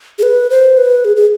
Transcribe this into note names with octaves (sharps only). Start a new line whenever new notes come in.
G#4
B4
C5
B4
G#4
G#4